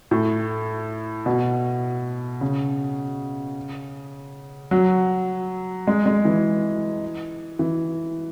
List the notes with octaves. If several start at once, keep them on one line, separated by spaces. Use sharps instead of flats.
A2
B2
C#3
F#3
G#3
G#3
E3
E3